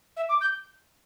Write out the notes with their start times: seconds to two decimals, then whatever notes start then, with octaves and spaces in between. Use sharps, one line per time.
0.17 E5
0.29 D6
0.41 G6